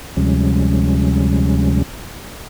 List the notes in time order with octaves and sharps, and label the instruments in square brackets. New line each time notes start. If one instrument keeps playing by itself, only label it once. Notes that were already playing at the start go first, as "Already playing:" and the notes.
[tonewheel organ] D2 C3 F3 G3 G#3 C#4